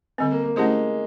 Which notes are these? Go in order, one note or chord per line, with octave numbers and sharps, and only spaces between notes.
D3 G3 B3 C4
A#3
A#3
G#3 A3 C#4 E4 G4 C5